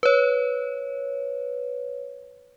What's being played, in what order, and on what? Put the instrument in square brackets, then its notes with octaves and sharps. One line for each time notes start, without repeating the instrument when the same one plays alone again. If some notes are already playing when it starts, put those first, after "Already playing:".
[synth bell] B4 C#5